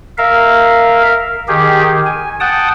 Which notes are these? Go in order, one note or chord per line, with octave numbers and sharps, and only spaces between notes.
A#4 E5 F5
D#3 G4 G#4
G#5
F#5 G5 A5 D#6